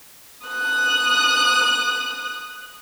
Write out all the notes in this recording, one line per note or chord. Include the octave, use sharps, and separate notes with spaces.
D#6 F#6